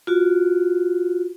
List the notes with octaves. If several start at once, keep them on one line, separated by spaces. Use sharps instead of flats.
F4 F#4